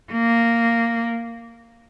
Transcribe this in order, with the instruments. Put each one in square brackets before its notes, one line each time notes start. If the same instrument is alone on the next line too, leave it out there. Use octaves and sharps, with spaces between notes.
[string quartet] A#3